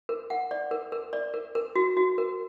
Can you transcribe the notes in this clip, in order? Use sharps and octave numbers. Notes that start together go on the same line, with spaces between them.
A#4
F#5
D5
A#4
A#4
D5
A#4
A#4
F#4
F#4
A#4